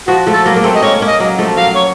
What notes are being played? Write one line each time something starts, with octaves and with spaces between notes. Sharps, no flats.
F3 F#4
F3 A3
A4
F#3 A#3
A#3
A3 C4
D#5
A#3 C#4 C#5
A#3 C#4
D#5
F#3 A#3
F3 A3
F#3 A#3 F5
C#5